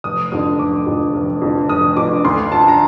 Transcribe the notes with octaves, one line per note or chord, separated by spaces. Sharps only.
F1 D#6
F2 D3 D#6
F1 D6
F2 D3
F1
F2 D3
F1 D#6
F2 D3 D6
D2 C6
D3 F3 A5
A#5